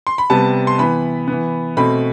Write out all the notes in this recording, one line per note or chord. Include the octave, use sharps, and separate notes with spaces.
C6
B5
C3 G3 B3 A5
C6
E3 B3 B5
E3 B3
B2 A3 C4 B5